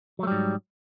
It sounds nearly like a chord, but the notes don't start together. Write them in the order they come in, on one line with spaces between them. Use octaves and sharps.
F#3 A3 G3 G#2